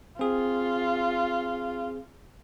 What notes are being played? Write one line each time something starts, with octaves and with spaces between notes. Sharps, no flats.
C4 F4 G#4